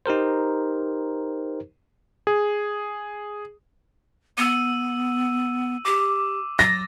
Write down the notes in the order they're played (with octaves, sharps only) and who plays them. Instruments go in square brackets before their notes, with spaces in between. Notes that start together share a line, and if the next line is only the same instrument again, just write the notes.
[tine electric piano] D#4 G4 A#4 C5
[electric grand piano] G#4
[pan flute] B3 [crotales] E6 D#7
[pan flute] G4 [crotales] D6
[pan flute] F#3 [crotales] A6 [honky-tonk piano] A#6